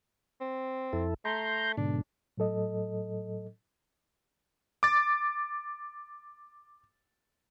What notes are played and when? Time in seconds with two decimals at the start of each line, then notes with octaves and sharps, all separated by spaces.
0.41 C4
0.93 F2 E4 A4
1.25 A3 A#5 C6 G6
1.77 G#2 B2 D3 D4
2.38 A2 F#3 A4 D#5
4.83 D6 A6